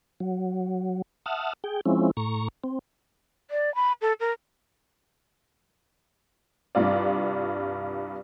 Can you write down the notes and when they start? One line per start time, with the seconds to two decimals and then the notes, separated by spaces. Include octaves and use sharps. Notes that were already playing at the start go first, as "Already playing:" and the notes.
0.20 F#3
1.26 E5 F#5 A5 D#6 F6
1.64 G#4 G5
1.86 F3 G#3 C4 C#4 E4
2.17 A2 A#5 C#6
2.64 C4
3.51 D5
3.75 B5
4.01 A4
4.20 A#4
6.75 C2 G2 F4 D5